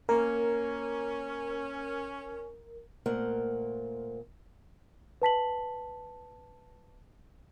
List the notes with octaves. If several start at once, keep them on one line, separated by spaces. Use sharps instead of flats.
A#3 C#4 A#4
A#2 A3 A#3 A#4 C5 F#5
B4 A5 B6 F#7